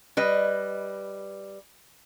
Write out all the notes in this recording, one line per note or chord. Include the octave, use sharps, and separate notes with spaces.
G3 B4 D#5